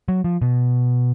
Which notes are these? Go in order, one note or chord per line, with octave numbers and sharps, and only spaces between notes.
F#3
F3
B2